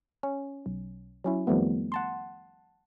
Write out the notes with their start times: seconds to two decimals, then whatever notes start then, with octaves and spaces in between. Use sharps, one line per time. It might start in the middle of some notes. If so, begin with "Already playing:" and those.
0.23 C#4
0.66 B1
1.24 F#3 C#4 E4
1.47 F2 D#3 F3 G3 A3 B3
1.92 F#5 A5 C6